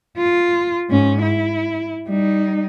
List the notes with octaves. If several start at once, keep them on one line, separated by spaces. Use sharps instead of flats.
F4
G#2 C#4
E4
G3 D#4